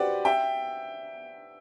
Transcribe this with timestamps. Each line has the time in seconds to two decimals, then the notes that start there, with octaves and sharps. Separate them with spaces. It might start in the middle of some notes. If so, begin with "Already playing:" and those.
Already playing: F#4 G4 B4 C5 D5 F#5
0.25 E5 G5